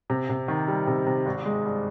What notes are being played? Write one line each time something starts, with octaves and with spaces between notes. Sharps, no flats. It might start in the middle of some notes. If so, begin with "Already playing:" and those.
C3
C3
D#3
G3
C3
C3
G#1
G#3
G2